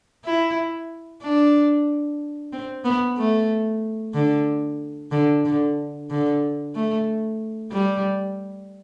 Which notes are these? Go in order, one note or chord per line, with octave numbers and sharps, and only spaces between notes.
E4
D4
C4
B3
A3
D3
D3
D3
D3
A3
G3